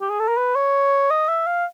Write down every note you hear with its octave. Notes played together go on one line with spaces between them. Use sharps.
G4
G#4
A4
A#4
B4
C#5
D#5
E5
F5